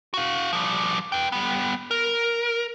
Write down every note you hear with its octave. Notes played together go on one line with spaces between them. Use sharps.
F#4 F5
F3 G3
B4 G5
G3 B3
A#4